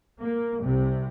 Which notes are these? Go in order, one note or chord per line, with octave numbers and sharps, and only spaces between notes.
A#3
C2 C3